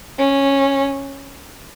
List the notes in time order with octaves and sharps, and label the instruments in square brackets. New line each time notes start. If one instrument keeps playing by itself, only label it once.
[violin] C#4